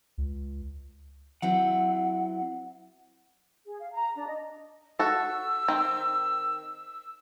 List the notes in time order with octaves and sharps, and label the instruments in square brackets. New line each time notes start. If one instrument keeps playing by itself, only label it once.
[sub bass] C#2
[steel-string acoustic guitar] F#3 C4 E4 [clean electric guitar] F#5
[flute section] G#4
F5
A#5
D4
D#5
[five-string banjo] F#4 A4 [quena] E6
[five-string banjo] D#3 C4